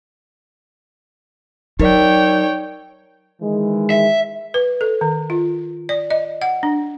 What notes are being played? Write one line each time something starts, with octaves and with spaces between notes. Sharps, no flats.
F#3 D#4 A#4 C#5 D5 G5
D#3 E3 G#3
E5
B4
A4
D#3
F4
D5
D#5
F#5
D4